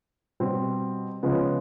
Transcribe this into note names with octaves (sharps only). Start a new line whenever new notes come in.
B2 G3 C4
C#3 F3 G#3 B3